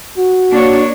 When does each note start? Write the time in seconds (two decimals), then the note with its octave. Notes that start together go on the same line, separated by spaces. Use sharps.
0.18 F#4
0.50 A#3 D4 C#5